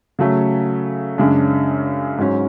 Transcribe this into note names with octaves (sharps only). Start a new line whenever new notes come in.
C#3 F#3 A3
F#2 C#3 G#3 D4
G#2 F#3 C#4